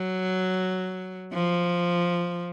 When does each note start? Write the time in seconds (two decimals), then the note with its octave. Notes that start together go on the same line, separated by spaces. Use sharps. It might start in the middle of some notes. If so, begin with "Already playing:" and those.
Already playing: F#3
1.33 F3